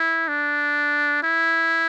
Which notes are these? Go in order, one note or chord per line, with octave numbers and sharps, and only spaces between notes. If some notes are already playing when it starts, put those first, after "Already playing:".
Already playing: E4
D4
E4